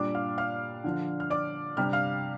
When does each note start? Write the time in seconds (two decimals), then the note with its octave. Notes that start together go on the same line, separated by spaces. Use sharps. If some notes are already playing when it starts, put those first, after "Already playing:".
Already playing: A#2 G3 D4 D5 D6
0.15 F5 F6
0.38 F5 F6
0.84 D3 F3 D4
1.20 F6
1.30 D5 D6
1.77 C3 G3 D4 F6
1.93 F5 F6